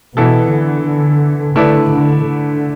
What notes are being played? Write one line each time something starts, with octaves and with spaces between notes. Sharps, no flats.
B2 E3 B3 E4 A4
D3
D3 A3 E4 B4 D5
D3
D3